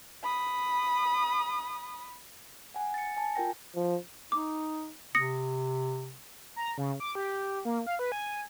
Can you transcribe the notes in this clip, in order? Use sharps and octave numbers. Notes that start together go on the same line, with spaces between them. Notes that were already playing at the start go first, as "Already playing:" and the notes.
B5 D#6
F#5 G#5
A6 C#7
G#5 A5
F4 A#4 G5 A#6
F3
D#4 D6
C3 D#6 A#6 C#7
A#5
C#3
D6
G4
A#3
F5
B4
G#5